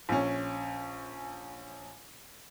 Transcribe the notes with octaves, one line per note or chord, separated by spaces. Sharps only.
A#1 C#4